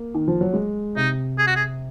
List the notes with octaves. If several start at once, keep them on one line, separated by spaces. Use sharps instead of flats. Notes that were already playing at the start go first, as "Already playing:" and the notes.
Already playing: A#3
D#3
F3
F#3
G#3
C3 D#4
G#4
F#4
G#4